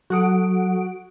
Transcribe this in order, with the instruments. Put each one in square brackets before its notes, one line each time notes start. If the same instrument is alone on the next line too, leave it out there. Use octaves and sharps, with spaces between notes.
[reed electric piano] F#3 A4 D#6 [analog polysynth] F#4 F#5 D7